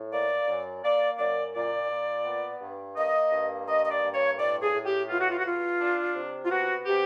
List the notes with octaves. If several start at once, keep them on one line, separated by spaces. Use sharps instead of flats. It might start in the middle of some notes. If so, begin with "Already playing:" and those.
Already playing: A2
A#3 D5
F#2
A#3 D5
F#2 D5
A#2 D5
A#2
B3
G2
A#3 D#5
G2
A#3 D#5
D#5
D5
G2
C#5
A2 D5
G#4
A2
G4
B3 F4
F#4
F4
F#4
E2 F4
D4
C3
F4
B3 F#4
C3 G4